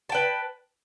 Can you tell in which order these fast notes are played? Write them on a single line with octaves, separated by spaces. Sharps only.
A5 G5 B4